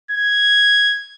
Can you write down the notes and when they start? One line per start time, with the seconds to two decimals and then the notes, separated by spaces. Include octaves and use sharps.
0.11 G#6